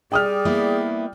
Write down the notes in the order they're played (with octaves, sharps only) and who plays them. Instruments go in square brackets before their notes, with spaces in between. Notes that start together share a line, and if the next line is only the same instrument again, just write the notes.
[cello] G3 D5 [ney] G#4 [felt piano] G5 D#6 F6
[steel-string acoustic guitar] A#3 B3 E4